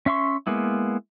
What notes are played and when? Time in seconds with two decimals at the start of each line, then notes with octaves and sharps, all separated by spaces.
0.06 C#4 E5 C6 C#6
0.47 G#3 A#3 B3 E4